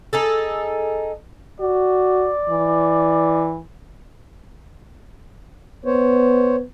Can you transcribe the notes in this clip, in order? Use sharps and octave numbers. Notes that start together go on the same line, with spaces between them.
D#4 G#4 A4
F#4 D5
E3
B3 C5 C#5